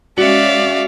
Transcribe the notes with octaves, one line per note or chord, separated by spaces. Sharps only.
G#3 C#4 F#4 D5 E5 F5